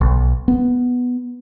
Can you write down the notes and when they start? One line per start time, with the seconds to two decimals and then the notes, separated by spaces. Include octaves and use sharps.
0.01 B1
0.48 B3